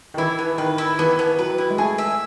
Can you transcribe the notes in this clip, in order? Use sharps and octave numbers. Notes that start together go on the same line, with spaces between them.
D#3
E3 E4
B3
D#3 B4
E4
E3 B3
B3
F#3 B4
E4
G#3
A3 G#4
E5